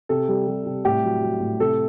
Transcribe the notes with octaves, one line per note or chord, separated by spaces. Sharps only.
C3 A4
G3
G3
C3
A2 G4
F#3
F#3
A2
C3 A4